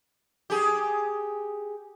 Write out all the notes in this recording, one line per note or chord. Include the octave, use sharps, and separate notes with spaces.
G4 G#4